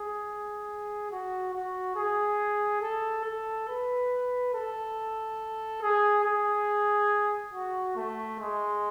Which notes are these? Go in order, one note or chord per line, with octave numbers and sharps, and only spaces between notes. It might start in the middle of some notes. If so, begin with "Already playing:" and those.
Already playing: G#4
F#4
F#4
G#4
A4
A4
B4
A4
G#4
G#4
F#4
A3
G#3